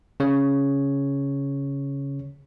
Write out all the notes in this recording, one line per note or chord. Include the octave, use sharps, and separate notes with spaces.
C#3 C#5